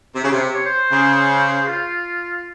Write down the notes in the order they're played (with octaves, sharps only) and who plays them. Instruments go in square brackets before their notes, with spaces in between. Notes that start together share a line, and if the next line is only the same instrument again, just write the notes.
[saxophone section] C3
C#3
C3
[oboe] C#5
C5
[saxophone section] C#3
[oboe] F4